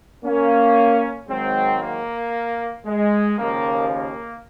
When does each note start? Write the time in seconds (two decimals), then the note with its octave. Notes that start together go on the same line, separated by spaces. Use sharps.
0.24 A#3 C#4
1.29 G#2 D#3 F#3 G#3 C4
1.81 A#3
2.86 G#3
3.38 D#2 C#3 F3 A#3
3.91 A#3